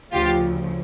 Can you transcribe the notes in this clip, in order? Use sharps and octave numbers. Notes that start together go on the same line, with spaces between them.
D2 C#3 F3 F4 G4